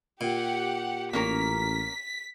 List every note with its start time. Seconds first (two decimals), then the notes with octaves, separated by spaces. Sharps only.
0.21 A#2 G4 F#5
1.13 A1 A#3 C#4 A#4 B6